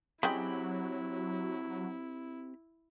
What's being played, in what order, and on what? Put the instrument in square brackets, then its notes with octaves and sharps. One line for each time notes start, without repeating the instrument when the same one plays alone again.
[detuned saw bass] F#3 [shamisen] G#3 C#4 G5 [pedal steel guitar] C4 G4 B5 [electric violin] E4